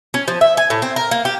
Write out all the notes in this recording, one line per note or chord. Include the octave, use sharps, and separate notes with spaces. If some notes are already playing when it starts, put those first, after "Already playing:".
C#4
F3
E5
G#5
A2
C4
A#4
A#3
G4